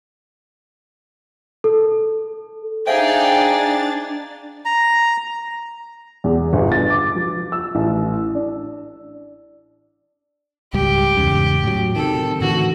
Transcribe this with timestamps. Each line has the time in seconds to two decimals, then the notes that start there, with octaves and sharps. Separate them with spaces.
1.64 A4
2.87 D4 D#4 G#4 C5 E5 F5 G5 A6
4.65 A#5
6.24 E2
6.53 G1
6.72 A6
6.90 D6
7.15 F3
7.52 E6
7.75 A1
8.35 D4
10.74 C#2 G#2 G3 G4
11.17 E2 G#2 C#3
11.63 A2 F#3
11.96 C3 D#3 A4
12.41 A2 D3 E3 F#4